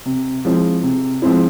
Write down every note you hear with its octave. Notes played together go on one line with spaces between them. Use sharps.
C3
F3 G#3 C4 E4
C3
F3 G#3 C4 E4